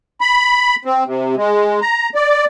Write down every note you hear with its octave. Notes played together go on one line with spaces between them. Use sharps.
B5
C4
C3
G#3
A#5
D5